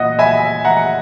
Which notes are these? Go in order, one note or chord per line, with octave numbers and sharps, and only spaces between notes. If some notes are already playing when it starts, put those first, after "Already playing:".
Already playing: A#2 D#5 F#5
E5 G#5
F#5 A#5